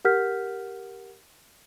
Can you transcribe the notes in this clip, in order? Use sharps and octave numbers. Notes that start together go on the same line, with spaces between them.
G4 A#4 F#5 F6 G6 B6